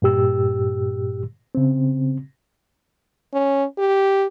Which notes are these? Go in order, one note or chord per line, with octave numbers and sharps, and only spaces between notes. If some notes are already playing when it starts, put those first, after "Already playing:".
G2 A#2 G4 E6
C#3 C4
C#4
G4